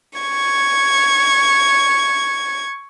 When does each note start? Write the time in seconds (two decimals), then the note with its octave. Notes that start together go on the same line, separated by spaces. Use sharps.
0.18 C#6 G#6